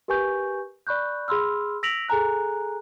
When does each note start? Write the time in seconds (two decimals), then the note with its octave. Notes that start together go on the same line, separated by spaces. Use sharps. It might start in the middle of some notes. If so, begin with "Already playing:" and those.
0.08 G4 A#4 B4 G#5 C#6 G6
0.87 D5 B5 C#6 F#6 G6
1.28 G#4 B5 C6 E6 F6
1.83 E6 A#6 B6 D7 F7 F#7
2.09 G#4 A4 G#5 A#5 F#6